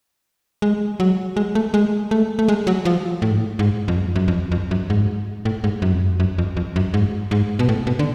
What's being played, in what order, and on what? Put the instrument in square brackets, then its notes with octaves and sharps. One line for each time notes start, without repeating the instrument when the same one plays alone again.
[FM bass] G#3
F#3
G#3
A3
G#3
A3
A3
G#3
F#3
F3
A2
G#2
A2
G#2
F2
F#2
F#2
F2
F2
F#2
G#2
A2
G#2
F#2
F2
F#2
F#2
F2
F2
F#2
G#2
G#2
B2
A2
B2
D3